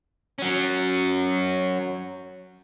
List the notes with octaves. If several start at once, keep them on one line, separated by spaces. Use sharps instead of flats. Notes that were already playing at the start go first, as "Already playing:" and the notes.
F#3 C#4